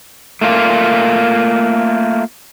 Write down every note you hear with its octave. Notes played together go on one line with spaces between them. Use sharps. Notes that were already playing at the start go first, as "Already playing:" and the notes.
A3 A#3 F4